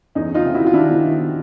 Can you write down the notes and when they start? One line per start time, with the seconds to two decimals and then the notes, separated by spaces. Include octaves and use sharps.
0.15 E2 C#4 D#4
0.34 D#4 F4
0.45 C3
0.54 E4 F#4
0.66 F4
0.73 D#3 D4 E4
1.03 D#3